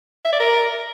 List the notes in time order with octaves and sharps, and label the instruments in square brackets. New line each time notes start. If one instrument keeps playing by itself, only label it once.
[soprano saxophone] E5
D5
A#4